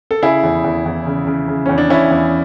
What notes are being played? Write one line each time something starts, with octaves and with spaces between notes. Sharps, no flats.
A4
C#3 E4 G#4
E2
E2
E2
C#3
C#3
C#3
E2 C#4
D4
E2 C#4 E4
E2